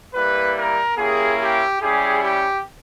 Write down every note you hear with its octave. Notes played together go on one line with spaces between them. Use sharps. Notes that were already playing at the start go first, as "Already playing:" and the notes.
G3 A#3 E4 B4
A#4
A#3 C#4 E4 G4 G#4
G4
G3 C#4 E4 G4 G#4
G4